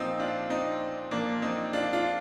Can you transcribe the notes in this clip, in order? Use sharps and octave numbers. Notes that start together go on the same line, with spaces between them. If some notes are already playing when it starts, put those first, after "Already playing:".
Already playing: A#2 F3 C4 D#4
D4 F4
C4 D#4
A#2 F3 A#3 D4
C4 D#4
D4 F4
D4 F4